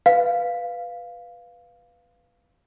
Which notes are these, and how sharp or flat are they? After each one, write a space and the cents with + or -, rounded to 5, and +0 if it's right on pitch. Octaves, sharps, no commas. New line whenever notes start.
B4 +0 F5 +0